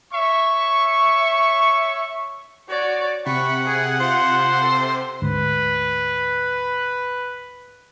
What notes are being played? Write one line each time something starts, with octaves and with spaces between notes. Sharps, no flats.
C#5 E5 C#6
F#4 C#5 D5
C3 F#5 B5 C#6
G#4 G#5
F4 C5
A4
D2 G#2 B4